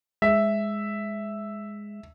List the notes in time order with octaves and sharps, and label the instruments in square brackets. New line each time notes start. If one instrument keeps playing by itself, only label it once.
[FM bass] G#3 [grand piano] E5